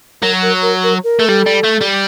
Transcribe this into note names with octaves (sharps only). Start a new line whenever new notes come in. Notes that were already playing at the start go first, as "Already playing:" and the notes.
F#3 A#4
A#4
A#4
A#4
A#4
A3
G3 A4
G3
A3
G3